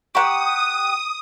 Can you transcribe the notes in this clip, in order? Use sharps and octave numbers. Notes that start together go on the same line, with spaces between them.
G4 F#5 A#5 C6 C#6 D#6